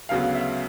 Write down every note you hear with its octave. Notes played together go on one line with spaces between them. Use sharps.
D2 C#3 F#3 B3 F5
E5